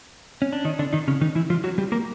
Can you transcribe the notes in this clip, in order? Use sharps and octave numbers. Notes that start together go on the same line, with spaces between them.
C#4
D4
D#3 D#4
D3 D4
D#3 D#4
C#3 C#4
D#3 D#4
E3 E4
F3 F4
F#3 F#4
G3 G4
A#3 A#4